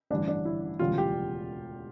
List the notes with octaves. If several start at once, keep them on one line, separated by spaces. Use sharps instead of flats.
A1 G2 E3 D4
D4
E4
E1 D2 C#3 E3 G3 F4
G4